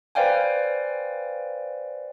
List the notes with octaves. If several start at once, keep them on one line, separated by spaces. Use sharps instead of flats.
B4 C5 D5 F5 G5 G#5